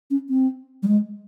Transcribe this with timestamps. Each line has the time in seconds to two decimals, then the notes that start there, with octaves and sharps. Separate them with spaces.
0.11 C#4
0.30 C4
0.83 G3
0.88 G#3